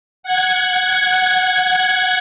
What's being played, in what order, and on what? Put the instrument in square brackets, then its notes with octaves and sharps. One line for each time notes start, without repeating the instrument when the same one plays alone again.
[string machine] F#5 G#6